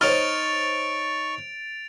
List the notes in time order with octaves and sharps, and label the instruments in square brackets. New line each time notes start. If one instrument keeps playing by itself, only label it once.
[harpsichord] D#4 [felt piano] C5 C#5 F6 [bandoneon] C#6 [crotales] A6 D7 F7